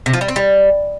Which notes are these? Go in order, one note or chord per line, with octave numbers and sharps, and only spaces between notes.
C3
F3
G3
C4
G3